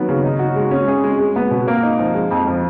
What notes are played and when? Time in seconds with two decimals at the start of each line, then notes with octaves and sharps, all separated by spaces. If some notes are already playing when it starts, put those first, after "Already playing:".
Already playing: D#3 F#3 B3
0.09 C#3
0.24 D#4
0.39 F#4
0.56 G#3
0.71 C#4
0.88 G#4
1.04 G#3
1.19 G#3
1.36 B3
1.51 B2
1.68 A#3
1.83 D#4
1.99 F3
2.15 G#3
2.31 F2
2.47 F3